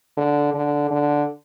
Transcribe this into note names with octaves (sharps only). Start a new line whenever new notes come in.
D3
D3
D3